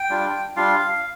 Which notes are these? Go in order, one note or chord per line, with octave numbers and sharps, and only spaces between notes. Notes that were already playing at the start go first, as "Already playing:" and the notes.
Already playing: G5
G3 D4 F4
G3 D4 F4 F5
F5